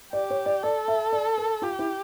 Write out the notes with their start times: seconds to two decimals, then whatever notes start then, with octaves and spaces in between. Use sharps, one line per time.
0.13 G4 D5
0.30 C#5
0.46 D5
0.63 A4 D5
0.88 E5
1.13 D5
1.38 A#4
1.62 F4 G4
1.79 E4